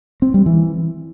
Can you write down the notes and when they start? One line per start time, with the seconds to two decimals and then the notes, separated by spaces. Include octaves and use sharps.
0.22 C4
0.34 G3
0.46 E3